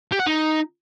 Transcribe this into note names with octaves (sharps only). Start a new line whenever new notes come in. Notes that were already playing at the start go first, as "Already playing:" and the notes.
G4
F#5
D#4